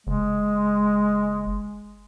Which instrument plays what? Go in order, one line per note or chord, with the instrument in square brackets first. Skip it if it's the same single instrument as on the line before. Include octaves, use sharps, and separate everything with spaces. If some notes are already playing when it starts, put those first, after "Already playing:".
[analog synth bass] F#1 [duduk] G#3